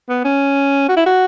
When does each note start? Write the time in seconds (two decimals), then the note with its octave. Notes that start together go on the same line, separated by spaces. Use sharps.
0.09 B3
0.24 C#4
0.89 F#4
0.97 E4
1.06 F#4